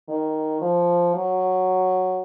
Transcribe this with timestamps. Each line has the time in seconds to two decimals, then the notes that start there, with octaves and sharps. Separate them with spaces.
0.09 D#3
0.62 F3
1.15 F#3